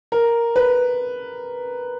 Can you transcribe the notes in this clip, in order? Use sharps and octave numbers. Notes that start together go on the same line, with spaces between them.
A#4
B4